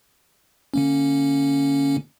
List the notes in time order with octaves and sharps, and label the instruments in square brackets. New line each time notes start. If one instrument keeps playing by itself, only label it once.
[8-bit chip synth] D3 A#3 C#4